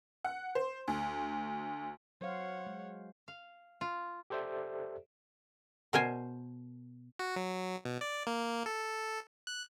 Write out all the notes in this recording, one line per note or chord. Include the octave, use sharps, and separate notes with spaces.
F#5
C5
D2
F#3 C5 C#5 F5 F#5
G#3
F5
F4
G4 A4 C5 D5 E5
B2 A#4 C5 G#5
F#4
F#3
B2
D5
A#3
A4
F#6